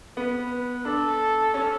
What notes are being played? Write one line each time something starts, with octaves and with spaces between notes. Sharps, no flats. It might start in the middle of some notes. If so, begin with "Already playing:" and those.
B3 B4
B4
D4 A4
C#4